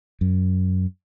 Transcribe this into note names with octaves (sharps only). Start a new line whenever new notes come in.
F#2